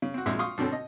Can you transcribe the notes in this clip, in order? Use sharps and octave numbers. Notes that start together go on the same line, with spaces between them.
C#3
C4 F#4
A#1 G#3 C4 E5
F5 C6 C#6 D#6
B2 D3 C4 C#4 A4
D#5